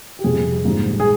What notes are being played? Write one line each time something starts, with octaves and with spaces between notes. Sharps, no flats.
G4
F2 C3 G3 G#4
A#1 G#2 G3
G#4